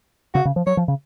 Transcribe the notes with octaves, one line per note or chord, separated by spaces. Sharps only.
C#3 F#4
C#3
F3
F#3 C#5
F3
C#3